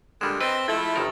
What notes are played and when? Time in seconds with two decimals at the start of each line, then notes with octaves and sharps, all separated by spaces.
0.21 G2 A#2 D3 G3 G#3 E7
0.41 C4 B4 D#5 E6 A6 G7
0.68 F3 G#3 A3 E4 A6
0.96 G1 D#3 A#4